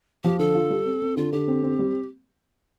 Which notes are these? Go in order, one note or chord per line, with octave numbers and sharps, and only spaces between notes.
F3 G4
D3 A4
F4
G3
C4
C4
D3 F4
D3 G4
C4
C4
G3